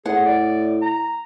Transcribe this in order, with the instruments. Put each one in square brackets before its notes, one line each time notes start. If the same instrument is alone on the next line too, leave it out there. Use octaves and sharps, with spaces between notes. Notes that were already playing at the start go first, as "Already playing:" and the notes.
[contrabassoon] A2 [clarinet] G#4 [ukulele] F#5
[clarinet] D5
A#5